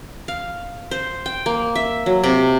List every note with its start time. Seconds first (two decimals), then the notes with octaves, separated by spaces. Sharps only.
0.28 F5
0.91 C5
1.26 G5
1.46 A#3
1.75 E5
2.06 F#3
2.24 C3